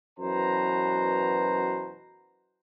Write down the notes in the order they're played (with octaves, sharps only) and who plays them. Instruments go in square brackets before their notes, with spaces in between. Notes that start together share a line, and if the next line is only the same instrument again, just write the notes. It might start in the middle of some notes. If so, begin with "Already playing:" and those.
[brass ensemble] F#2 B2 E3 B4 C5 A#5